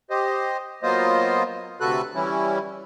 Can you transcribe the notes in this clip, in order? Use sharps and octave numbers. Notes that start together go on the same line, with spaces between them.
G4 C5 D#5
F#3 A#3 B3 F4 C5 D#5
D2 C3 F#4 A4 B4 F#6
E3 G3 C#4 E4